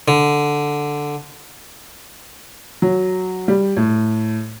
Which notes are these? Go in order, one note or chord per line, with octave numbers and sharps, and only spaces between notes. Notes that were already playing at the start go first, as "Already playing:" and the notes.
D3
F#3
G3
A2